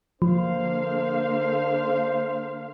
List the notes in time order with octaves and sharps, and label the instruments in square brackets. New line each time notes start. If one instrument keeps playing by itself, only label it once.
[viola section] D3 A#3 F5 [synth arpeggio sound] F3 [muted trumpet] C5